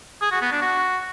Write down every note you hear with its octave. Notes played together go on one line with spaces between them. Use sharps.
G#4
F#4
B3
D4
F#4